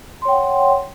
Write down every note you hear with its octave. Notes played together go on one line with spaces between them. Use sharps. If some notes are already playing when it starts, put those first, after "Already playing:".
C#5 F#5 G5 C6